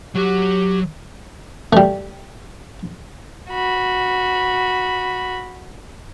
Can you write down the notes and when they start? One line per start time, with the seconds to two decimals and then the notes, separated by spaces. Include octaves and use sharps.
0.15 F#3 G4 F#5
1.73 G3 A3
3.50 F#4 B5